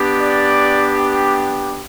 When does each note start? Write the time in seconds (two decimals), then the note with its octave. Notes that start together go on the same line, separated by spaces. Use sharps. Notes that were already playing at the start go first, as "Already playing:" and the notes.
Already playing: B3 D4 G4
0.20 D5